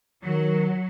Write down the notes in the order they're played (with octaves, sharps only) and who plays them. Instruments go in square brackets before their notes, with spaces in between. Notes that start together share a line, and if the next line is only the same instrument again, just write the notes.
[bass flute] D#3 [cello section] F#3